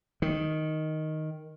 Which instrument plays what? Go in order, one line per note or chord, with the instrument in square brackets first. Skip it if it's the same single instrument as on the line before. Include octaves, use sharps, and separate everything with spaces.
[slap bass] D#3